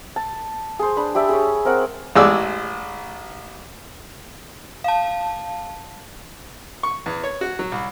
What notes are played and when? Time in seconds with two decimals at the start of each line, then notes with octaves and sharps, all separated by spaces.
0.16 A5
0.79 G#4 C5
0.97 D4 B4
1.15 G4 D5 E5 A5
1.29 G#4 C#5
1.65 C4 A#4 C#5 F#5
2.16 A1 G#3 D5 E6
4.84 F5 A5
6.83 C#6
7.06 E2
7.24 C#5
7.41 F#4
7.59 F#3
7.72 C2